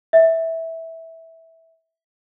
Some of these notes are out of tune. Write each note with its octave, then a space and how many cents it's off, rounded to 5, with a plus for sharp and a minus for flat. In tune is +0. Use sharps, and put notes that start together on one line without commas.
E5 -15